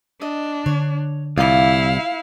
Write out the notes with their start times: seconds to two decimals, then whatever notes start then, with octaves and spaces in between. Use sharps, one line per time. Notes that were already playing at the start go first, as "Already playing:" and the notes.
0.21 D4 D#5
0.66 D3 C#5
1.38 C2 E4 F4 F5 B5 D6